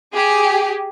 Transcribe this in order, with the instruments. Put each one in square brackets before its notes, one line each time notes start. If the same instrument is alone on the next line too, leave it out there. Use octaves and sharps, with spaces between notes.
[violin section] G4 G#4